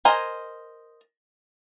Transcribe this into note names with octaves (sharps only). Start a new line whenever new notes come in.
A#4 C5 D#5 G#5